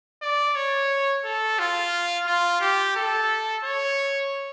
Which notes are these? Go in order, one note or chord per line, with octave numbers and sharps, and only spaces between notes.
D5
C#5
A4
F4
F4
G4
A4
C#5